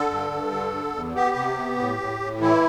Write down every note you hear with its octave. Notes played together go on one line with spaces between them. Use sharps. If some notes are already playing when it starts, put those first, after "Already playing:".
Already playing: D3 A4
G2
G2
D3
D3
E2
B3 G4
C3
B3
A2
A2
A2
E3 E4